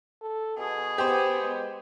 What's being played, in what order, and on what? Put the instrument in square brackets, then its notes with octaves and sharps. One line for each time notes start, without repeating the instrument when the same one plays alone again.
[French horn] A4
[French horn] B2 [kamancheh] G#4
[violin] B3 [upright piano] G4 C5
[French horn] G#3